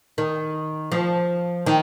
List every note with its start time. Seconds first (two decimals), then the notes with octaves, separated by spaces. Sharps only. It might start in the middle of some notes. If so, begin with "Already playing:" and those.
0.18 D#3
0.92 F3
1.66 D#3